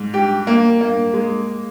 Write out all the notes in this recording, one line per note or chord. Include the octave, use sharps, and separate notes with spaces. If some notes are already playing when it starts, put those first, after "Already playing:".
Already playing: G#2
G4
A#3
A#3
G#3